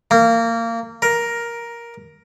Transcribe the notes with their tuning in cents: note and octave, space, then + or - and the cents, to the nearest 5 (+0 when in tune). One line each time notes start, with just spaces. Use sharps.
A#3 -25
A#4 +10